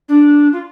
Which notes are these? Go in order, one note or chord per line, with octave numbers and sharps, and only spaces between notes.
D4
F4